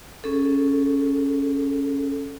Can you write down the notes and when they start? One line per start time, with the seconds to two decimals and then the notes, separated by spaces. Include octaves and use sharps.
0.24 C#4 G#4 A4